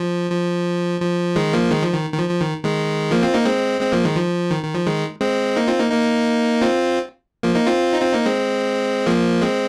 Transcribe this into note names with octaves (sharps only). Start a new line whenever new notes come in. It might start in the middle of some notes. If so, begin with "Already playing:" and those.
Already playing: F3
F3
F3
D#3 G#3
F3 A#3
D#3 G#3
F3
D#3
D#3
F3
F3
D#3
D#3 G#3
F3 A#3
C4 F4
A#3 D#4
G#3 C4
G#3 C4
F3 A#3
D#3 G#3
F3
D#3
D#3
F3
D#3 G#3
G#3 C4
A#3 D#4
C4 F4
A#3 D#4
A#3 D#4
C4 F4
F3 A#3
A#3 D#4
C4 F4
D#4
C4 F4
A#3 D#4
G#3 C4
F3 A#3
G#3 C4